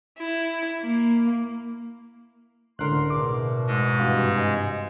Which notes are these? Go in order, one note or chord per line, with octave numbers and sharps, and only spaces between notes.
E4
A#3
C#2 A2 D3 A#4 C6 F#6
E2 B2 D6
G#2 G#3
G2 C3 E3 F#4 B4 F5
D#5 G#5